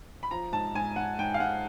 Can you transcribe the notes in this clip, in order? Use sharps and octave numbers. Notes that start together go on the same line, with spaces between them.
B5
F3 A#5
G#2 A5
G#2 G#5
G#2 F#5
G#2 G5
F5
G#2 F#5